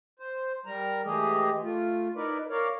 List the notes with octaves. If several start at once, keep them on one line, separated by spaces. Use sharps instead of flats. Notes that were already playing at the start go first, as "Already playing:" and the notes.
C5
G3 A#4 A#5
E3 G#3 A3 G4 G#4 D#5
A3 F4
D#4 E4 A#4 B4 D5
A#4 C#5 D5 F5